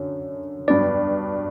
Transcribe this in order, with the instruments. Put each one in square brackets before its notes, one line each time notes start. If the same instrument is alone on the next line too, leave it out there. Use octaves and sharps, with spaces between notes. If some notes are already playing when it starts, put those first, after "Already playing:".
Already playing: [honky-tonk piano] F#2 D3 [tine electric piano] C#5
[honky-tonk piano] G2 F#3 B3 D4 [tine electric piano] D5